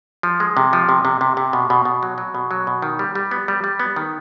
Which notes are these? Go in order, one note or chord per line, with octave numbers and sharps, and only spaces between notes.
F3
G#3
C3
F3
C3
C3
C3
C3
B2
B2
B2
F#3
F#3
B2
F#3
B2
D#3
G3
G3
B3
G3
G3
B3
D#3